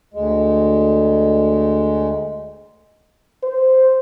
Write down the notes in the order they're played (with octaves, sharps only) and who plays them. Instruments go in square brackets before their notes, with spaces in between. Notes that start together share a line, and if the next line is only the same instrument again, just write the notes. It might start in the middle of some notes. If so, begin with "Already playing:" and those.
[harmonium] D2 G#3
[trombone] C5